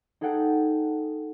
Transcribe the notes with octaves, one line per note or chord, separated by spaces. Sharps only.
D#4 G#4 A4 F#5 G5